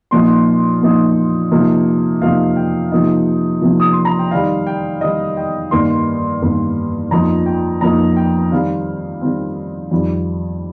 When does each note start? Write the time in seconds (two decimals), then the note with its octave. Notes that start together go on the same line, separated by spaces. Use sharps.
0.11 A#2 F3 A#3 D#4 C6
0.82 A#2 F3 A#3 D#4
1.51 C3 F3 A#3 D#4
2.22 C3 F3 A#3 D#4 F5
2.56 G5
2.92 C3 F3 A#3 D#4
3.61 C3 F3 A#3 D#4
3.80 D#6
3.93 C6
4.05 A#5
4.19 G5
4.31 D#3 G3 D#4 F5
4.67 G5
5.01 D#3 G3 D#4 D#5
5.37 G5
5.71 G2 D#3 A#3 C6
6.42 G2 D#3 A#3
7.11 F2 F3 A#3 D#4 A#5
7.46 G5
7.81 F2 F3 A#3 D#4 A#5
8.16 G5
8.52 D#3 G3 C4 F5
9.21 D#3 G3 C4
9.91 F2 D#3 G3